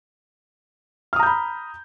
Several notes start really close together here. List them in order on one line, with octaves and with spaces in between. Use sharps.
F6 D#6 A#5 G6 B5